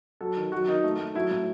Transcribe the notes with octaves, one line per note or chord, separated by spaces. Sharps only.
F#3 A4
D#3
F#3 F#4
D#3 D#4
A3
A3
F#3 E4
A2